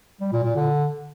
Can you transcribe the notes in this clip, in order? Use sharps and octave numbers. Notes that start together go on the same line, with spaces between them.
G3
A#2
A#2
D3